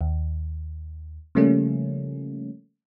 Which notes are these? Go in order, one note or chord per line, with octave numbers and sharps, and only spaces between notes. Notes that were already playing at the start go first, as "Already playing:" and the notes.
D#2
C#3 F3 G3 A3 A#3 C#4